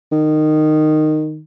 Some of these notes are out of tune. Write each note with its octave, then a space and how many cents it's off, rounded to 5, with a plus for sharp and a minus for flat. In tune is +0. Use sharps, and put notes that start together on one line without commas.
D#3 -15